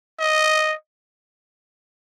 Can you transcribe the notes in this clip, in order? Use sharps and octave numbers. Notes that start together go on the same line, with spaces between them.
D#5